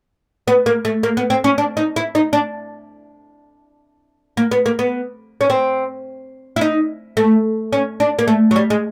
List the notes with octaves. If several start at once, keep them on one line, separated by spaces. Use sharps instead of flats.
B3
A#3
A3
A#3
B3
C4
C#4
D4
D#4
E4
D#4
D4
A#3
B3
A#3
B3
C#4
C4
E4
D#4
A3
C#4
D4
A#3
A3
F#3
G3
G#3